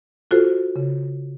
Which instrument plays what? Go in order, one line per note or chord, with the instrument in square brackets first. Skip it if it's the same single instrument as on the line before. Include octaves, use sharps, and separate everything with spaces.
[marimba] F4 F#4 A4 C5
C#3